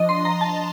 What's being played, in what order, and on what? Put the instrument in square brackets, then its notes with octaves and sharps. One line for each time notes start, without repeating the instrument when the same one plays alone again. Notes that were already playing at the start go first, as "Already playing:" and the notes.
Already playing: [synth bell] F3 D4 D#5
C6
A#5
A5